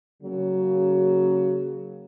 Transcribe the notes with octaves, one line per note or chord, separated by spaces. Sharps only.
C#3 F#3 A#3